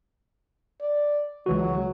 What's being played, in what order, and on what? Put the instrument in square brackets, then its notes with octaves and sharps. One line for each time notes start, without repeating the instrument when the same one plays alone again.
[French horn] D5
[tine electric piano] C#2 E3 F#4 [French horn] F#3